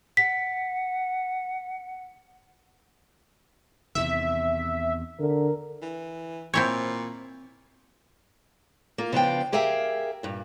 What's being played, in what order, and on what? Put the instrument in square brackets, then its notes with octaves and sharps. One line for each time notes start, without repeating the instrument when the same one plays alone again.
[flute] F#5 [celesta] B6
[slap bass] E2 C3 D#3 [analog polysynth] E5
[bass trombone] D3 [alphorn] A#4
[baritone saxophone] E3
[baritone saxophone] A#2 [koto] C4 E4 C#5
[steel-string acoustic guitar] A#3 F4
C#3 F3 B3 D4 F5 G5
G4 G#4 A#4 E5 F5 G5
G2 A#2